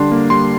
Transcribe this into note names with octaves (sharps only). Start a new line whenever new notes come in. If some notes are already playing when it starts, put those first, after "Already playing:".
Already playing: D3 G3 D4 C6
A#3
G3 C6